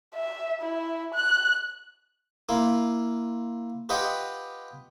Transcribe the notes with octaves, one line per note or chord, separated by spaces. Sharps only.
E5
E4
F#6
A#3 E4 F4
F4 G4 B4 D#5 F#5 G5